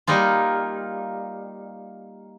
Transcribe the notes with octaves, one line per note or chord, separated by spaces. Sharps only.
G3 A#3 D#4 F4